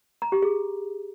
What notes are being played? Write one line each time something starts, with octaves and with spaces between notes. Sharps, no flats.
A#5
G4
G#4